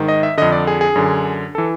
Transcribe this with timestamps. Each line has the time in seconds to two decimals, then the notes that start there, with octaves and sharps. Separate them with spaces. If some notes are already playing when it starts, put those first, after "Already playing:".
Already playing: G#2 D#3
0.08 D#5
0.23 E5
0.37 F2 D3 D#5
0.52 D5
0.67 G#4
0.81 G#4
0.96 F#2 D3
1.55 E3 A4